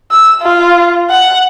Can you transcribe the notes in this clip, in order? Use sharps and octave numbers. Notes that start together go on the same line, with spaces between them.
E6
F4
F#5